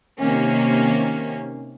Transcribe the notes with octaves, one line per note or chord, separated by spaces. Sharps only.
C3 D#3 A#3 C#4